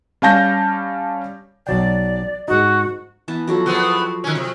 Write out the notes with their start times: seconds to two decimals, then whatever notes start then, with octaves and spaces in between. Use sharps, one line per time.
0.22 G3 C#4 F5 A5 G6 A#6
1.67 B1 F#3 D5 G5
2.48 G#2 D#4 F#4
3.28 E3 B3 A5
3.47 F3 F#3 A4
3.66 E2 B3 C4 C6 C#6
4.24 D#3 C#4
4.35 C3 C#5